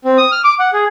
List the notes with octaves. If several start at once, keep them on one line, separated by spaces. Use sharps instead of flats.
C4
D#6
F6
D6
F#5
G#4